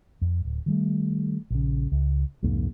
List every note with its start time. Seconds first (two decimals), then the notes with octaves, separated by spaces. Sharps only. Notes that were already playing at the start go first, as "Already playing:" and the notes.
0.21 F2
0.45 D1
0.66 D#3 G3 A3
1.50 A#1 C#3
1.92 C#2
2.43 C2 F2 G#2 A#3